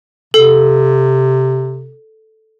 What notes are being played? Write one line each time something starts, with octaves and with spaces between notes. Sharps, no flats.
C3 A4